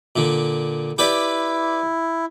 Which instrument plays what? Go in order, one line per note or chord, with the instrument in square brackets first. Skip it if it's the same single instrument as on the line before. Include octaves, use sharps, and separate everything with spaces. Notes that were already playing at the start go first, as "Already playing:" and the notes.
[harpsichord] A#2 D3
[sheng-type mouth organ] E4 [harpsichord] G4 B4 D5